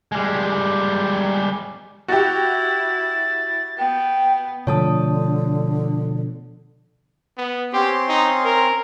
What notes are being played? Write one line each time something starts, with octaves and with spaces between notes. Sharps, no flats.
G3 G#3
E4 F#4 G4 A6
B3 G5
B2 D3 F3 A3 C#5 A5 D#6
B3
C4 C#4 G4 C6
D#4
A#4